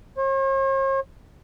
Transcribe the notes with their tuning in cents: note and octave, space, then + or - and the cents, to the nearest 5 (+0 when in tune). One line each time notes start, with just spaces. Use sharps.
C#5 -45